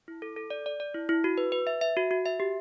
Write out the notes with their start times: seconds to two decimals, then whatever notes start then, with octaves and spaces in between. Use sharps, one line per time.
0.08 E4
0.22 A4
0.36 A4
0.50 D5
0.66 D5
0.80 D5
0.95 E4
1.09 E4
1.24 F#4
1.38 B4
1.52 B4
1.67 E5
1.81 E5
1.97 F#4
2.11 F#4
2.25 E5
2.40 G4